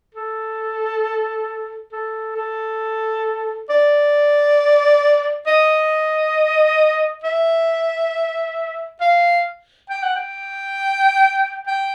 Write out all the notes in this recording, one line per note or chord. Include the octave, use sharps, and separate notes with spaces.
A4
A4
A4
D5
D#5
E5
F5
G5
F#5
G5
G5